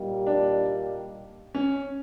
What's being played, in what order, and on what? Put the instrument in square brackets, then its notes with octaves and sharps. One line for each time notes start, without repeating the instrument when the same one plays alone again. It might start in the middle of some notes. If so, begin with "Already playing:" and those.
Already playing: [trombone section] A#2 G3 A#3 D#4 G4
[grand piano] D4
C#4